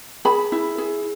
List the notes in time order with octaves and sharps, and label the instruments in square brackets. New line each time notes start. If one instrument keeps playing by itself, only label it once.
[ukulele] G#4 B5
E4
G#4